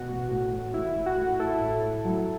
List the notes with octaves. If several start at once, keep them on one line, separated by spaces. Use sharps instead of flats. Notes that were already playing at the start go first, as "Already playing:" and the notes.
Already playing: B2 F#4
A1
A2
A2
A1 E4
A2
F#4
A2
A1 E4 A4
A2
A2
F#3